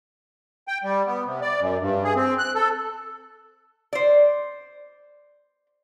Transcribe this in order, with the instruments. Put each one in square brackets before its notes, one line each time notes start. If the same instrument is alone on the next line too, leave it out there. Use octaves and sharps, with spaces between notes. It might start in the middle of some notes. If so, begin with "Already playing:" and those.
[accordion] G5
G3
B3
C3
D5
F#2
G2
G#4
C4
F#6
A4
[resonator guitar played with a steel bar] C5 D5